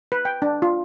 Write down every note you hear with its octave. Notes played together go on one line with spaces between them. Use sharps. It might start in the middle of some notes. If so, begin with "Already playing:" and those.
B4
G5
D4
F4